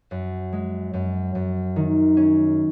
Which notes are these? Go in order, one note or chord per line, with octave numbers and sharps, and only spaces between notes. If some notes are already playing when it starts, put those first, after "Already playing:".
F#2
G#3
F#2
F#2
D#3
C#4